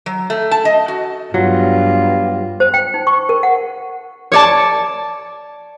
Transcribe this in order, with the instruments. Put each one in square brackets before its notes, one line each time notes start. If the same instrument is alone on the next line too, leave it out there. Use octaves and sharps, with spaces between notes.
[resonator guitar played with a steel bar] F#3
A3
A5
D#5
F#4
[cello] G2 [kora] F#3 [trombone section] B3 G4 [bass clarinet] F4
[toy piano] C5
G5
D#4
C#6
A#4
F#5
[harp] C#5 D5 A5